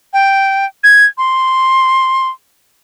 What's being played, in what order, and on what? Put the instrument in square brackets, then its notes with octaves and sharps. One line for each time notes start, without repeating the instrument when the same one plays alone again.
[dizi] G5
G#6
C6